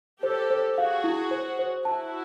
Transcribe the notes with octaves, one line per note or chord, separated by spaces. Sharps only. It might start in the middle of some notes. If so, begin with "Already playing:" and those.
G4 A4 C5
C5
F#4 G#4 F5
E4
C5
C5
E4 F#4 A5